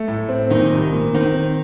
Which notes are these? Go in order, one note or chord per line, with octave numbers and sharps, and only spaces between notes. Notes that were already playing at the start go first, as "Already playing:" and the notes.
Already playing: A3
A2
C4
A#2 D#3 D#4
C2
A#2
D#3 C4 D#4
C4